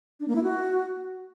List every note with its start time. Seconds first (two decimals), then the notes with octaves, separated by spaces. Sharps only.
0.20 D4
0.28 A#3
0.36 E4
0.43 F#4